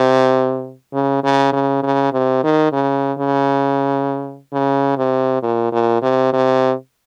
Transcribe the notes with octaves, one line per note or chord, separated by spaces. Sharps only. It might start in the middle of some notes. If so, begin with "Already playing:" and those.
Already playing: C3
C#3
C#3
C#3
C#3
C3
D#3
C#3
C#3
C#3
C3
A#2
A#2
C3
C3